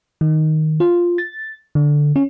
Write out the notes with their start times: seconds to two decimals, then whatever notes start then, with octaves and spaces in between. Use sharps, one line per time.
0.21 D#3
0.80 F4
1.18 A6
1.75 D3
2.16 C#4